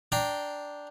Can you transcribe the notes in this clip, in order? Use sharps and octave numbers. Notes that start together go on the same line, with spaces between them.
D4 G5 A#5 C6